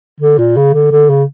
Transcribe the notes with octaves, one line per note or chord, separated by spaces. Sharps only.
D3
A#2
C#3
D3
D3
C#3